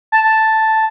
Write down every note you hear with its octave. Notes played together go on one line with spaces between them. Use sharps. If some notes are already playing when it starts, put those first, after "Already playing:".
A5
A5